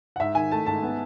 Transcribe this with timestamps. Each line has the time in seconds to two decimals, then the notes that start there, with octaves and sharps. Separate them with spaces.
0.16 F#5
0.20 G#2 E5
0.35 D#3 G#5
0.51 A3 A5
0.66 G#2 A5
0.83 B3